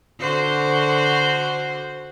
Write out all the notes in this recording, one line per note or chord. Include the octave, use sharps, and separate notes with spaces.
D3 F#4 C5